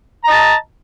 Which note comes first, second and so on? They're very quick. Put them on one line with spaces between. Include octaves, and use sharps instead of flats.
A#5 D#5 A5